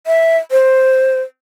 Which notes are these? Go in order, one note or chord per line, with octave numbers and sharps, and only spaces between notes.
E5
C5